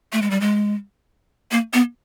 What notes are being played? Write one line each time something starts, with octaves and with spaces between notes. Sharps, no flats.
A3
G#3
G3
G#3
A#3
B3